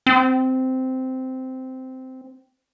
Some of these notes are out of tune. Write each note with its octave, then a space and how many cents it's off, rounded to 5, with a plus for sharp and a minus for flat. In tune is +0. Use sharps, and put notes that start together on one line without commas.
C4 -10